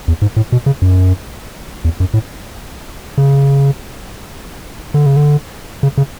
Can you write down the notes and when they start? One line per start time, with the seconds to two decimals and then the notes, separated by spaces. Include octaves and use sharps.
0.08 E2
0.22 G#2
0.37 A2
0.52 B2
0.66 C#3
0.82 F#2
1.85 E2
2.00 F#2
2.14 A2
3.18 C#3
4.94 D3
5.06 C#3
5.16 D3
5.83 C#3
5.98 C#3